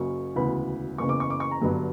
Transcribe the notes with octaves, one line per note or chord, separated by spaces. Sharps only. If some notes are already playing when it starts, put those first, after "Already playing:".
Already playing: F#1 F#2 C#3 F#3 C#6
E1 D2 C#3 E3 B3 B5
F#1 E2 C#3 E3 C#6
D6
C#6
D6
C#6
A#5
G1 G2 D3 F#3